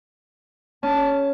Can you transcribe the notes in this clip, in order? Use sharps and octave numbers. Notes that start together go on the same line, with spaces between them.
C#4 G#4 A5